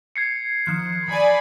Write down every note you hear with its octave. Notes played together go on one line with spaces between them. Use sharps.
G#6 C7 C#7
D#3 F3 F#6
D#3 D5 G#5 B5 G#6